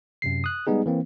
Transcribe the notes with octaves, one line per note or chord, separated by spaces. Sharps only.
F#2 C3 C7
D#6 F#6
G3 G#3 B3 D#4 G#4
E3 A#3 C4